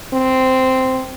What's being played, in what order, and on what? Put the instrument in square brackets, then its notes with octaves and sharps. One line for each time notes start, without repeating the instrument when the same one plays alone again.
[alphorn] C4